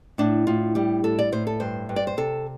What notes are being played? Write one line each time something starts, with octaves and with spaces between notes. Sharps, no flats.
A2 D4
A2 F4
G3 G4
A2 A4
D5
A2 C5
A4
G2 C5
G2
D5
C5
C3 A4